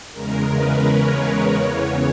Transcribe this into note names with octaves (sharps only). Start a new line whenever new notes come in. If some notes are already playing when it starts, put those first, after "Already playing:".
E2 C#3 G#3 A#4
B4
C#5
B4
E2 C#3 E3 B3 C#5